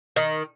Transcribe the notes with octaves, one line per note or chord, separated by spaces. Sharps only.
D#3